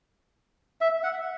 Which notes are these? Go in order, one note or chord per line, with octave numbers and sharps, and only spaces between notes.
E5
F#5